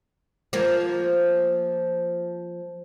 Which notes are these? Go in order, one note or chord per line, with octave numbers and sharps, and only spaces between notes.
F3 A#3